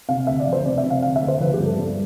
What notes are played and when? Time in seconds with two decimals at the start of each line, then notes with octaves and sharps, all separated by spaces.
0.09 C3 F5
0.27 D2 E5
0.40 D5
0.47 F3
0.53 C5
0.65 C3 D5
0.78 E5
0.84 C3
0.90 F5
1.02 D2 F5
1.16 E5
1.22 D2
1.28 C5
1.40 F3 B4
1.54 G4
1.60 G2
1.66 A4
1.79 G2